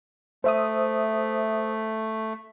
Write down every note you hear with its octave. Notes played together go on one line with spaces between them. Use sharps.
A3 C5 E5 D#6